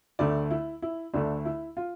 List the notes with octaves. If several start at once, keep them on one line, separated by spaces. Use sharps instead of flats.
D2 D3 A3 D5
E4
E4
D2 D3 A3 D4
E4
F4